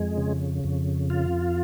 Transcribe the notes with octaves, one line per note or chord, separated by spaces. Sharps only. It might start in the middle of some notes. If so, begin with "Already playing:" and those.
Already playing: F2 G#3
C#3
F2
F4